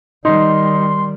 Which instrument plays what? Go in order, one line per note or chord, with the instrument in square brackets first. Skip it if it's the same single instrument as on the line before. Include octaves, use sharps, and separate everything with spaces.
[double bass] D#3 G3 [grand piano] D#4 [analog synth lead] C6